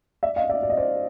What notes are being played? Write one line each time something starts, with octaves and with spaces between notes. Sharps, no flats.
D5 E5
D#5 F5
D5 E5
D5
D#5
C5 D5